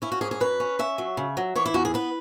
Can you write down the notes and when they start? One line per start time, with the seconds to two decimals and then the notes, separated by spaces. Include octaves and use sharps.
0.02 C#4 E4
0.12 F#4
0.21 G#2 G#4
0.31 G#4
0.40 F#2 B4
0.60 C#4
0.79 C#4 E5
0.98 F#3
1.17 C#3
1.37 F#3
1.56 E3 C#5
1.66 E4
1.74 E2 F#4
1.85 G#4
1.94 B3 B4